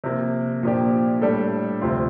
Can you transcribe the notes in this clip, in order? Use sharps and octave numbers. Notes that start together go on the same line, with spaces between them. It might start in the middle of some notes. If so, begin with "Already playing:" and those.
C3 F3 A#3
A#2 F3 A#3 D4 G4
A2 G3 D4 A4
D2 C3 F3 C4 F4